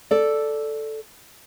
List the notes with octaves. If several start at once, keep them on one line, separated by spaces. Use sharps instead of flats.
A4 D5